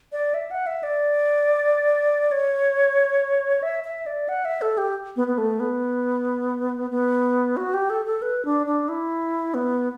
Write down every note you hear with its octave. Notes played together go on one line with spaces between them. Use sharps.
D5
E5
F#5
E5
D5
C#5
E5
E5
D5
F#5
E5
A4
G4
B3
B3
A3
B3
B3
F#4
G4
A4
A4
B4
D4
D4
E4
B3